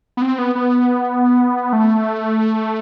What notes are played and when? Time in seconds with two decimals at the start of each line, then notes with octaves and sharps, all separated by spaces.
0.17 B3
0.22 C4
0.38 B3
0.55 B3
1.73 A3